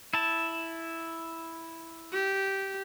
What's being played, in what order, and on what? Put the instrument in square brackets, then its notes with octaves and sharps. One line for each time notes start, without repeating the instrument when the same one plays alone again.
[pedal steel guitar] E4 A5
[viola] G4